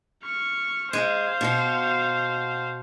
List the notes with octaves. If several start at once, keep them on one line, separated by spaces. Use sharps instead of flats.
C#6 F6
G#3 C5 F5
B2 F#4